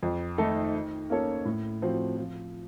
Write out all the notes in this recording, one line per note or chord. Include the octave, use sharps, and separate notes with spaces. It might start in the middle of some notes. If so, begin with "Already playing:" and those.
F2
D#3 A3 D#4 A4
D#3
A#3 C#4 A4 C#5
A2
F3 C4 F#4
F3